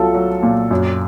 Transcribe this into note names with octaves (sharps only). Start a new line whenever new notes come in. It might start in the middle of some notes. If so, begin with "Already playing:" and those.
Already playing: C2 F#3 F4 A4
F#3
A#2
F#2